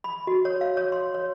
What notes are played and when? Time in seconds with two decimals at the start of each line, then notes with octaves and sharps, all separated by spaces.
0.04 B5
0.27 F#4
0.45 C#5
0.61 F5
0.77 C#5
0.92 C6
1.14 C#5